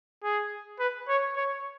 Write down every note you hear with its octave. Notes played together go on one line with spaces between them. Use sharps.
G#4
B4
C#5
C#5